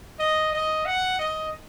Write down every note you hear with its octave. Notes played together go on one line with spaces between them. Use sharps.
D#5
D#5
F#5
D#5